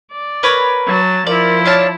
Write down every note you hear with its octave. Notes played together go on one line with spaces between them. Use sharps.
D5
A#4 B4 C#5
F#3 A5
F3 E4 A#4 D5
D4 C#5 F5 A5